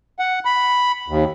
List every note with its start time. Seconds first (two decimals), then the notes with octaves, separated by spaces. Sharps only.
0.19 F#5
0.45 B5
1.08 D#2